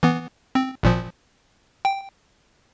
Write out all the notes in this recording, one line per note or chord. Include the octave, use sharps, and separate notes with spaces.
E3 B3
C4
G#1 A#2 F3
G5